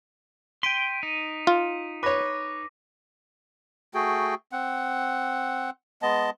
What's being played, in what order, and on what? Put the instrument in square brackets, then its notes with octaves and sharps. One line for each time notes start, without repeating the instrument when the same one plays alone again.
[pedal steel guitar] G5 C6 [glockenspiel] B6 D7 D#7
[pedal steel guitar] D#4
[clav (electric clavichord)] F4
[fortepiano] B4 C#5 [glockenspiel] D6 A#6
[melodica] A3 F#4 G#4 G5
C4 F#5
G#3 B3 D#5 A5